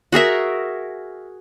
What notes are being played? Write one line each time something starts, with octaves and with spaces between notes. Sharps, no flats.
F#4 G#4 A#4 E5